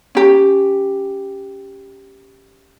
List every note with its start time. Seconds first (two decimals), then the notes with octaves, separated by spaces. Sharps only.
0.15 C#4 G4